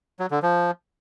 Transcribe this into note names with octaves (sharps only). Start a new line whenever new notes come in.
F#3
D3
F3